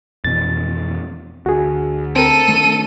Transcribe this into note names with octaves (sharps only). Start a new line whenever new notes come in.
F2 B2 E3 A6
D2 F#4 G#4
C4 A4 A#4 D#7
D#3 A3